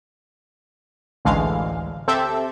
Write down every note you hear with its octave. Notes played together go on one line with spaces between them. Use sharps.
A1 D2 D3 E3 G#3 F5
C4 G4 A4 E5